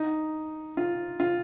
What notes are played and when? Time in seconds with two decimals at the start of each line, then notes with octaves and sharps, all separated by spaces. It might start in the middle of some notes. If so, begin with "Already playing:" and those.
Already playing: D#4
0.77 F4
1.20 F4